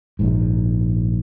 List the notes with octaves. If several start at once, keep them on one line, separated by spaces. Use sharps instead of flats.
A#1 G#2